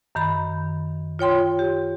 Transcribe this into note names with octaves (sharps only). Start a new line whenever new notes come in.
F#2 D#3 A#5 B5
F4 C#5 G5 C6
G4